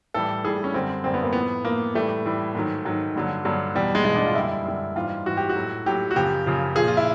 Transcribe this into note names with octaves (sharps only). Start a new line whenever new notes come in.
A2 E3 G3 A4
A2 E3 G3 G#4
C#4
F#2 D3 G3 C4
F#2 D3 G3 C4
B3
A#3
A2 F3 B3
A2 F3 A#3
A2 E3 G3 A3
A2 E3 G3
G#2 D#3 F#3
G#2 D#3 F#3
G2 D3 F#3
G2 D3 F#3
E2 B2 G3
G#3
E2 B2 G3 G#3
D4
F4
F#2 D3 G3 E4
F#2 D3 G3
G#2 E3 G3 F4
G#2 E3 G3 F#4
G4
F#4
A2 F#3
A2 F#3 G4
F#4
F#2 C#3 F3 G4
F#2 C#3 F3
A#2 F3 G#4
F4
E4